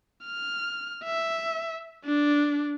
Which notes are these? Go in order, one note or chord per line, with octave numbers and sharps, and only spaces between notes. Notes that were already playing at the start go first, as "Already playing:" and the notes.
F6
E5
D4